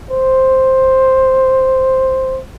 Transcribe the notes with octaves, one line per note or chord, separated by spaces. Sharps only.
C5